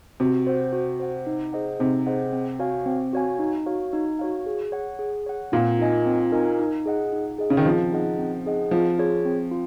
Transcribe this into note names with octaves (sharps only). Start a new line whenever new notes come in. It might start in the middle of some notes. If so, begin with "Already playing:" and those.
C3 F#4
C5 F#5
F#4
C5 F#5
D#4
G#4 C5 D#5 F#5
C3 D#4
G#4 C5 D#5 F#5
C4
F#4 C#5 F5 G#5
C4
F#4 C#5 F5 G#5
D#4
F#4 C#5 F5
D#4
F#4 C#5 F5
G#4
C#5 F#5
G#4
C#5 F#5
A#2 C4
D#4 A#4 D#5 G#5
C4
D#4 A#4 D#5 G#5
D#4
G#4 D#5 F#5
D#4
G#4 D#5 F#5
C#3
D#3
F3 C4
D#4 G#4 D#5 F#5
C4
D#4 G#4 D#5 F#5
F3 C4
F4 G#4 C#5
C4
F4